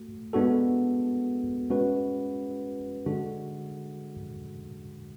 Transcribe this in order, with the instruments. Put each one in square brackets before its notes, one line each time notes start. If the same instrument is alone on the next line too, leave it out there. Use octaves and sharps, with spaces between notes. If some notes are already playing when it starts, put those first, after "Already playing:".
Already playing: [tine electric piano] A3 F#4
G#3 B3 D4 F#4 A4
G#3 C#4 F#4 B4
D3 G#3 D4 F#4 A4